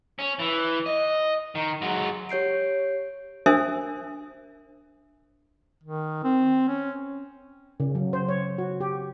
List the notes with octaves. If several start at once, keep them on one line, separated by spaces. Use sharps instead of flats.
C#4
E3
D#5
D#3
F#3 G#3
G4 C#5 G6 C7 D7
D4 A#4 C5 E5 G#5 D#6
D#3
C4
C#4
C#3
F#3
C5
C#5
F#4
G4